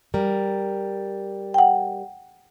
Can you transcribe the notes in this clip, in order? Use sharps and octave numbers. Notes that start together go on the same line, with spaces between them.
G3 A#4
F#5 G5